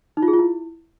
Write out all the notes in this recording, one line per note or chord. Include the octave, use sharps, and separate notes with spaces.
D#4
F4
G#4
F4
E4